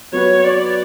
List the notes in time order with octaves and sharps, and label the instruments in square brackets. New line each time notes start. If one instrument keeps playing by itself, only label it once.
[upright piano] F#3 B3 F#4 B4 [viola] C#5
[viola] D5